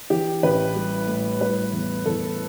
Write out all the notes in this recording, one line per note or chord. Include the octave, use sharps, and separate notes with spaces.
E3 G4
A1 B4
G3
A2
G3 B4
E2
E2 A4